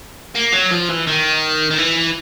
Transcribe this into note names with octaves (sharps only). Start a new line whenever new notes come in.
A#3
F#3
F3
E3
D#3
D#3
E3